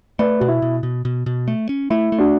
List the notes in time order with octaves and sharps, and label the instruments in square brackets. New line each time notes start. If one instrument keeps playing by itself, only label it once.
[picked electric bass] A3 [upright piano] B4 D5
[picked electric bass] B2 [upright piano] F#4
[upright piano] E4
[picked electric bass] B2
B2
B2
B2
A3
C#4
[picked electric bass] A3 [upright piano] E4
[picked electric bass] A3
[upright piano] D4 F#4